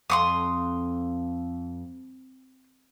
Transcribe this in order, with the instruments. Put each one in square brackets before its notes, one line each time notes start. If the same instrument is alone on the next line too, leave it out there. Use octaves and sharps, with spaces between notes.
[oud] F2 [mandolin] C6 C#6 D#6